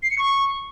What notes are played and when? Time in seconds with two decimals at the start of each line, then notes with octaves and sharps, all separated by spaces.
0.03 C7
0.11 C#7
0.18 C#6